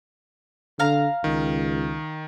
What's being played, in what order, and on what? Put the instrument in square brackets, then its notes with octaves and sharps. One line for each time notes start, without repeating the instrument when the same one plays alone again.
[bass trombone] D3 [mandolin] F5 A#5
[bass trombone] C#2 [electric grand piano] D#3